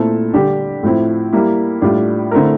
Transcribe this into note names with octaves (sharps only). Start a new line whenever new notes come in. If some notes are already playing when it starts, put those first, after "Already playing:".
Already playing: A#2 A3 C4 E4 A4
D3 G3 D4 G4
A2 F3 C4 E4
G3 A#3 E4
A2 G3 D4 F4
D3 A3 C4 E4 A#4